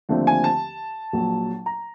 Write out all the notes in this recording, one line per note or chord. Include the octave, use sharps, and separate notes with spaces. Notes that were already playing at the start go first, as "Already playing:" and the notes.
D#2 D3 F3 A3 C4
G#5
A5
A#1 A#2 F#3
A#5